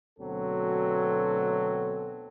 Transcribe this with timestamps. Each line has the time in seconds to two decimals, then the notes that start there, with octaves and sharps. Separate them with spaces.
0.19 D2 B2 F#3 C4 A4